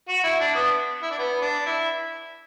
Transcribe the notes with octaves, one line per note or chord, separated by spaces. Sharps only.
F#4
E4
D4
B3
E4
D4
B3
D4
E4